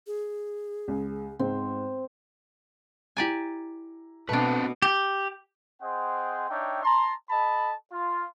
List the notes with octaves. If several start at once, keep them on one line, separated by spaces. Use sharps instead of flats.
G#4
C#2
G#2 C4
E4 G4 D5 G#5 A#5
B2 A3 C4 D4 B4
G4
C4 G#4 C5 D#5 F#5 G5
D4 D#4 C#5 E5 G5
A5 A#5 C6
A4 D#5 A5 B5
F4